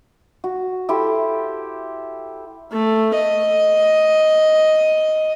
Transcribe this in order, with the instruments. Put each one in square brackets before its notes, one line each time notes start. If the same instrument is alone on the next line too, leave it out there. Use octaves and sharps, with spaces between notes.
[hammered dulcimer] F#4
E4 G4 A4 C5
[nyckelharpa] A3
D#5